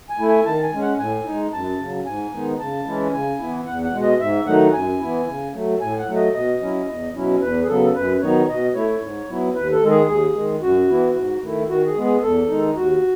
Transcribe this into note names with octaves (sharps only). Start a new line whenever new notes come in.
G#5
A3 E4
G#5
D#3 A5
G#5
G#3 C#4
F#5
A2 G#5
D#4
G#3
F#2 A5
C#3 F#3
G#2 G#5
D#3 G#3 B3 D#4
C#3 A5
E3 G#3 C#4 E4
C#3 G#5
E3 B3 E4
E2 F#5
F#5
B2 G#3
D#5
G#2 E5
D#3 F#3 A3 D#4 F#5
F#2 G#5
E3 B3 E4
C#3
F#3 A3
A2 G#5
F#5
F#3 A3
D#5
B2 D#5
F#3 C#4 E4
E2
B2 F#3 C#4 E4
E2 B4
G#4
C#3 F#3 B3 A4
F#2 B4
D#3 F#3 B3 D#4 C#5
B2 D#5
A3 E4 C#5
G#2
F#3 B3 E4
D#2 B4
A4
D#3 G#3
G#4
D#2 G#4
D#3 G#3
F#2 F#4
E3 B3 E4
G#2
D#3 A3 E4
D#3 F#4
G#4
G#3 B3
G#4
E2 A4
D#3 G#3 D#4
D#2 F#4